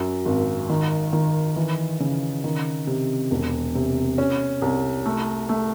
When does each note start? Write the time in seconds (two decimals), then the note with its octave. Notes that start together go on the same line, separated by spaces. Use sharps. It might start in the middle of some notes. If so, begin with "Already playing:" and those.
Already playing: F#2
0.26 G#1
0.69 D#3
1.13 D#3
1.56 E3
2.00 C#3
2.44 D#3
2.87 C3
3.31 E1
3.75 C3
4.18 C#4
4.62 C2
5.06 A3
5.49 A3